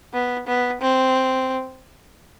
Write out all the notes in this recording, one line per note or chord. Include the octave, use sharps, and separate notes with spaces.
B3
B3
C4